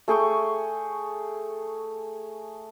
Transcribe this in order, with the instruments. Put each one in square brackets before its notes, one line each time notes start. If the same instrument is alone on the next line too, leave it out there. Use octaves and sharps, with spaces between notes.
[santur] A3 G#4 G5 C#6